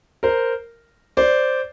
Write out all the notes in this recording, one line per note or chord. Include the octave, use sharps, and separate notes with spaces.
A#4 C5
C5 D5